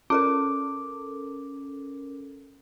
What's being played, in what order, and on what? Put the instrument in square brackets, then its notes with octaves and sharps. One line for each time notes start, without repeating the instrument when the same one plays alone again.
[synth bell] C#4 A4 A#4 [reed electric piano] D6